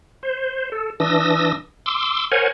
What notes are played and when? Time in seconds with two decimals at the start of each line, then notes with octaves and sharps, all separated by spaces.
0.23 C5
0.72 A4
1.00 E3 D4 D#6 E6 A#6
1.86 C6 D6 E6
2.32 A#4 C5 C#5 F#5 G#5